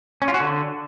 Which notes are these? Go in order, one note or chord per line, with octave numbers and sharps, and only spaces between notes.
C#4
F4
F#4
D3